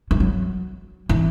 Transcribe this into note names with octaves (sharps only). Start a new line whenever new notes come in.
E3
F#3
E3